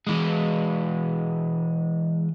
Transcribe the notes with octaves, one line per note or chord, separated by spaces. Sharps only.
E3 G#3